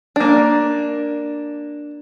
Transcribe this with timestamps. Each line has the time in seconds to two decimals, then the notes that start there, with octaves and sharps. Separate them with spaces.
0.16 A#3 D4